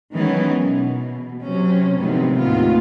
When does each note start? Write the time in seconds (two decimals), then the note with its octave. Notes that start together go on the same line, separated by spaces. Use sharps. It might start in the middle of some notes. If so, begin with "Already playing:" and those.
0.13 D#3 E3 F#3 G#3 B3 C#4
0.65 B2
1.42 C3 F#3 C#4
1.99 D2 G#2 C3 D#3 F3 B3
2.39 D#2 A2 A#3 B3 F4